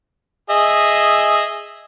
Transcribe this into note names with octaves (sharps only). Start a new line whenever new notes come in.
G#4 D#5 E5